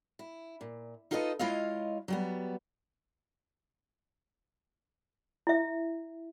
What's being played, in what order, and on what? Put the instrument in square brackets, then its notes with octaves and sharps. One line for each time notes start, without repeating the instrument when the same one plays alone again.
[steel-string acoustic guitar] E4
A#2
D#4 F4 A4 B4 C5 D#5
G#3 E4 F4 C#5 D#5 F5
F#3 G3 B3
[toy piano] E4 E5